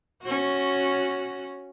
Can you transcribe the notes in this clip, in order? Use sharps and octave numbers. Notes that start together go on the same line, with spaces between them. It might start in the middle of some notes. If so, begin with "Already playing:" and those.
C#4 F#4